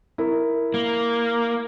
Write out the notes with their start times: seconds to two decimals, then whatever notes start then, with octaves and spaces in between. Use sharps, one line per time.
0.18 E4 A#4
0.74 A#3